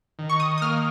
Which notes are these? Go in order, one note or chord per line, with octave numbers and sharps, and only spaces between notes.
D#3
C#6
D#6
D#6
A#3 F6